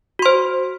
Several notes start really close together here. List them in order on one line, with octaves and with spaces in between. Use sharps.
F#4 C6 C5